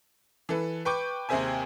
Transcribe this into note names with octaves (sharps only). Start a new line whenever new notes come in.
E3 A4 B4
B4 G5 C#6 D6 G6
D#2 C3 G#4 C5 E5 G#5